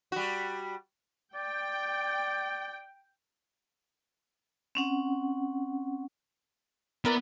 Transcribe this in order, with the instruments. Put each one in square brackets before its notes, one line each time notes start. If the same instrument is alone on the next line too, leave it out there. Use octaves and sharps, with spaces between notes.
[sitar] G3 F#4
[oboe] D5 [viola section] G5
[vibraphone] C4 C#4 F#5
[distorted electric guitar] B3 [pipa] E4 A#4 D5